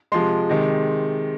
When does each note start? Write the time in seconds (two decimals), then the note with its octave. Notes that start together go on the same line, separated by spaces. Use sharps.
0.12 C3 F3 G#3 C6
0.49 C3 D#3 G#3